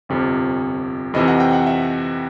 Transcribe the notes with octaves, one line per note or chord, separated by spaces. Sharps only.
G1 F2 C3
F2 C3 E3 D#5
F#5
G5
F#5
E5